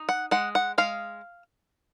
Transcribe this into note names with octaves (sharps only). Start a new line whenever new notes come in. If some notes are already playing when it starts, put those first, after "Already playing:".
Already playing: D#4
F#5
G#3 F#5
F#5
G#3 F5